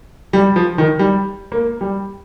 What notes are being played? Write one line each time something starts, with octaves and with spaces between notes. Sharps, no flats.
G3
F3
D#3
G3
A#3
G3